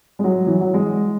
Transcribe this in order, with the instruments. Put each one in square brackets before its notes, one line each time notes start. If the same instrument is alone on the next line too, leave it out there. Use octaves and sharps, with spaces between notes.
[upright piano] G#3
F#3
E3
F#3
G#3